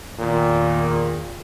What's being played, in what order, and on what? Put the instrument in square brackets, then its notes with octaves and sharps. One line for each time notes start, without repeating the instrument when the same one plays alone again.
[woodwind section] E2 D#3 [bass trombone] A#2